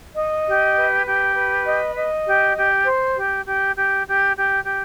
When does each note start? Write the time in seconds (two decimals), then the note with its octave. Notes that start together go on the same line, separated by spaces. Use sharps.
0.15 D#5
0.46 G4
0.76 B4
1.05 G4
1.35 B4
1.66 D#5
1.96 D#5
2.26 G4
2.56 G4
2.86 C5
3.15 G4
3.45 G4
3.75 G4
4.06 G4
4.36 G4
4.65 G4